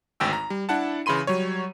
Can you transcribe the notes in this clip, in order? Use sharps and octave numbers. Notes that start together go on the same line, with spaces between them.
G#1 D2 G5 E6
A#5
G3
D4 E4 F#5 A5
C#3 E3 B5 C6 D#7
F#3 G3 C#5